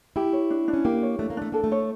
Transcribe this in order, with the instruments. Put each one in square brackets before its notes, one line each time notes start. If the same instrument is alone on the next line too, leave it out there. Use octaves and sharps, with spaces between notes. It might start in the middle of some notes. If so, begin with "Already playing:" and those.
[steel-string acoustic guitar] E4 [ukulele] G4
[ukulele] C#5
D4
D4
[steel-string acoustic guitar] C#4
[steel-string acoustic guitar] A#3 [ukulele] G4
[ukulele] C#5
[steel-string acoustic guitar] A3 [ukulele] D4
[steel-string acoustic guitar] A#3
[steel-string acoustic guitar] A3 [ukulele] D4
[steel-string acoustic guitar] A#3 [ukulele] A4
[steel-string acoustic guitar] A3
[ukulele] C#5